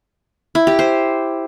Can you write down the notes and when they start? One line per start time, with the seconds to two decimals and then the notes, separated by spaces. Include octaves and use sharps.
0.55 E4
0.67 G4
0.79 C5